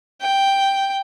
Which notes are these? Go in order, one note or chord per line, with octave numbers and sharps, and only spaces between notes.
G5